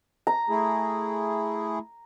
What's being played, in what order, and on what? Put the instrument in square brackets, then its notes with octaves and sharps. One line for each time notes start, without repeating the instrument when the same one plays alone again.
[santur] A#5
[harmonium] A3 E4 G#4